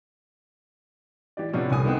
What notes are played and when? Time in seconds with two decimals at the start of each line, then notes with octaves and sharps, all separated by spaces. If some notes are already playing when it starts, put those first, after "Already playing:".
1.37 E3 G4 D5
1.53 C3 F3 B3 C#4 D4
1.70 F1 C2 G#5 D#6
1.85 D#3 B3 C4